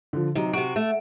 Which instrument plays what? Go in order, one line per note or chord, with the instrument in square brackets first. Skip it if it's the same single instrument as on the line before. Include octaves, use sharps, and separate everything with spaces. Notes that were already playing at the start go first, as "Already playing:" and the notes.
[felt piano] D3 F3
[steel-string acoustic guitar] C3 [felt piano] F#3 D#4
[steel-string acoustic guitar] C3 F#4 [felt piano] D7
[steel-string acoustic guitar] A3